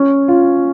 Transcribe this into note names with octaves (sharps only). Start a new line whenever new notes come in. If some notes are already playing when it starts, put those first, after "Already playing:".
Already playing: C#4
F4